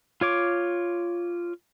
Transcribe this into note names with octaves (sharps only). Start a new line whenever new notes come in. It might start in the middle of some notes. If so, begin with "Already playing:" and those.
F4 C#5 D6